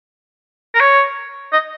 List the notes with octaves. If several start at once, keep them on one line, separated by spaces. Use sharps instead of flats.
A#4
C#5
D#5